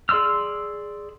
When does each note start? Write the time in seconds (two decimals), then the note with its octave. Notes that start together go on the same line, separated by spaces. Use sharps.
0.09 G#4 D5 C6 E6 F6